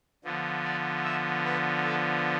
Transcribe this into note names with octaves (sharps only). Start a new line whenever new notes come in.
D3 F3 B3
D5
E5
B4
A4